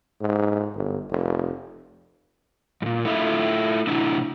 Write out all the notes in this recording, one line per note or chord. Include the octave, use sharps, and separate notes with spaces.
G#2
G1
F1
F#2 A#2
A3 E4 F4 E5
A2 C3 D4 E4